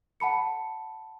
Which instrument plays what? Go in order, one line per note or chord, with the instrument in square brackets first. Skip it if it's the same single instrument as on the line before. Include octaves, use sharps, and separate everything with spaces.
[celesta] F#5 A5 B5 C#7